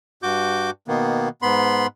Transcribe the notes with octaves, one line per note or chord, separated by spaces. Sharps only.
G2 F#4 D6 G6
B2 D#3 A#3 B3
G#2 B3 B5 C6